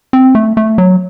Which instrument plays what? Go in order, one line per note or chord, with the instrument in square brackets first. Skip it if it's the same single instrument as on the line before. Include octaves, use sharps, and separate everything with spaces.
[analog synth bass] C4
A3
A3
F#3